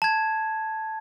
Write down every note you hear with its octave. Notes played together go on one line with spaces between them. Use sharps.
A5 G#6